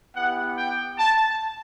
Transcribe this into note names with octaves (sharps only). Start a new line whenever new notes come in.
B3 E4 G4 F#5
G5
A5